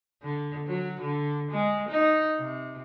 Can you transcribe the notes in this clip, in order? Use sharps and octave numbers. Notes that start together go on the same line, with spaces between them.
D3
F#3
D3
G#3
D#4
C3